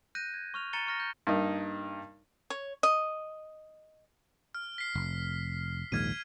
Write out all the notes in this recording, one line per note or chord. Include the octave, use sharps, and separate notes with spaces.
F#6 G6 A#6 D#7
G#6
C#6 F6 F7
A#5 A6 C#7 D#7 E7 G7
C#6 F6 A#6
G6
G2 A#3 D#4
C#5
D#5
F6
B6 C7
F1
A#1 D#2 G#2 F6 G#6 D#7